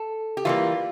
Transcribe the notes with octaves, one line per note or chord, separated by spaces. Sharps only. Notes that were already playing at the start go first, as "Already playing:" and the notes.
Already playing: A4
G4
E3 G3 A#3 F4